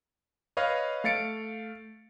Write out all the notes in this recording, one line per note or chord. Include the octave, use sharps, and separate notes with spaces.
B4 C#5 D#5 F5
A3 F5 A6 C#7 D7